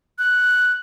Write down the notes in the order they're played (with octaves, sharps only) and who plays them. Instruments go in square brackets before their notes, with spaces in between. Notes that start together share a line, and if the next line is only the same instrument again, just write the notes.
[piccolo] F#6